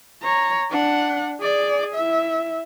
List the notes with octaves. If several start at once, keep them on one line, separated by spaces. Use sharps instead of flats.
C#5 A#5
D4 F#5
G#4 D5
E4 E5